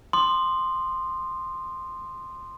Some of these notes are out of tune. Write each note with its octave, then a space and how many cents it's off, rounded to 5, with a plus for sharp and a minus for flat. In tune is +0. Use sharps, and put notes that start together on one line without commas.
C6 +0 D#6 -35